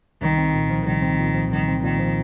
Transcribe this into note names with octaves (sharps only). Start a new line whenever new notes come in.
C2 D#3
C4
A#2
F3
C2 D#3
C4
A#2
F3
C2 D#3
C4
A#2 D#3
F3